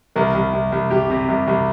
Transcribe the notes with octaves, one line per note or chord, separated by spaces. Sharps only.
C2 A#4
C2
C2
C2
C2 G4
C3
C2
C2